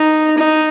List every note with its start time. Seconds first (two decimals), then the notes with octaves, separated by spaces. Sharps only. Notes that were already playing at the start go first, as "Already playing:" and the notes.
Already playing: D#4
0.38 D#4